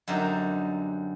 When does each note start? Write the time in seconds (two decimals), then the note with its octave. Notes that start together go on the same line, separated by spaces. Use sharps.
0.08 F#2 D3 F#3 G3 C4 D#4